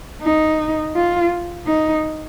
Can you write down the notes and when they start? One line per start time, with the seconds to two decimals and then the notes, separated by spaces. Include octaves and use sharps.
0.22 D#4
0.95 F4
1.67 D#4